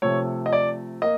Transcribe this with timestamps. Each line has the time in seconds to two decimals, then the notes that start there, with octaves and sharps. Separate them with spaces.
0.02 C3 F3 A3 C#5
0.46 D#5
0.53 D5
1.02 A#3 D#5